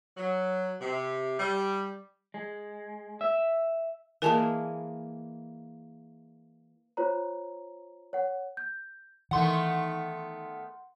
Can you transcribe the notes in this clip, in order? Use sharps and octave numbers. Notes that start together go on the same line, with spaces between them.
F#3
C3
G3
G#3
E5
E3 G#3 A#3 A#4 G#5 A5
F4 C5 C#5 A#5
C#5 F#5
G6
D#3 E3 A3 B3 F#5 C6